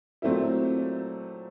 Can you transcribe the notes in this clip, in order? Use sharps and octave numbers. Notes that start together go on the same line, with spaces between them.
A#2 F#3 A3 C4 E4